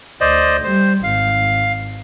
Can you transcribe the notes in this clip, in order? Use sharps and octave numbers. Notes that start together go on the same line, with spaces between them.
D2 C5 D5 D#5
G3 C5
G#1 F5